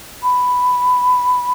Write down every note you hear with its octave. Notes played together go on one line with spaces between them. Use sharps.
B5